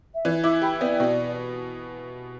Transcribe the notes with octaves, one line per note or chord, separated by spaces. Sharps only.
E5
E3 D5
E4 D6
G4 B5
B3 D5
B2